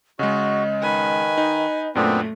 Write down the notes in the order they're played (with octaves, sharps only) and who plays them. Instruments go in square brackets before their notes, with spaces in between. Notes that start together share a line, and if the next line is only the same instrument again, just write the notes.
[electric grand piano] C#3 G#3 [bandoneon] F#4 [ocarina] D#5
[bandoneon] D#3 [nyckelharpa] B4 G#5
[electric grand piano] D#4
[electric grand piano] F#2 A#2 [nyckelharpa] A3 [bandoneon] B3 C4 D4